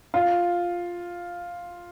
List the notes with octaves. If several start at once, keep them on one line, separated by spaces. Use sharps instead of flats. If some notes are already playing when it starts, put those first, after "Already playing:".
F4